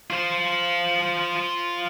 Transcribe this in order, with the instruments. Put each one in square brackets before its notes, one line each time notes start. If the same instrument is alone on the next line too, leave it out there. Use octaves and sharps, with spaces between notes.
[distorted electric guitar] F4 C5